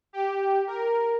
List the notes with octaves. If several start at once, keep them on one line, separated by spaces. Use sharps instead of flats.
G4
A#4